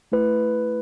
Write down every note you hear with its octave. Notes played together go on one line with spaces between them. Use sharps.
A3 E4 B4